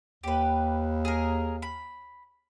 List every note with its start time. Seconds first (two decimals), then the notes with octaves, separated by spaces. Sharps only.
0.24 D#2 G4 B4
1.05 G#4 A#4
1.62 B5